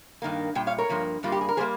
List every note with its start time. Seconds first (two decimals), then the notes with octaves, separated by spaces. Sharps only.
0.22 G2 D#3 A#3
0.55 A#2 G3 G5
0.67 C#5 F5
0.78 A#4 C#5
0.89 G2 F3 A#3
1.23 G2 G3 A#3 F4
1.32 G4
1.41 G#4
1.49 A#4
1.57 G3 A#3 G#4 C5